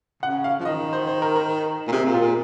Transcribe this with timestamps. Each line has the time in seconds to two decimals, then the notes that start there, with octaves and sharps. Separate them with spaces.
0.23 C#3 F#5
0.44 F5
0.60 F3
0.65 D#3 D#5
0.93 C5
1.07 C5
1.22 A#4
1.36 A#4
1.87 A#2
1.92 C3 G#4
2.06 A#2
2.14 F4
2.21 A#2